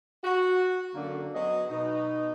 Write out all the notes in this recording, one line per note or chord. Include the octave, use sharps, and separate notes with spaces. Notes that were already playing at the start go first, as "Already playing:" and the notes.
F#4
F#2 D3 A#3
F#3 B3 G#4 D#5
B2 D#4